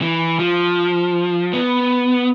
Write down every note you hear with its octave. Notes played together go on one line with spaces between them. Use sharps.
E3
F3
B3